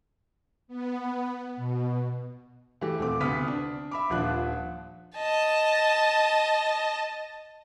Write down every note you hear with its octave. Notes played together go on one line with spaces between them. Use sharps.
B3
B2
E3 A3 G4
D#1 A3 C4 D6
D2 C3 B3 D#6 F6 B6
D4
E5 B5 D6
D#1 F3 D4 F#6
D#5 A5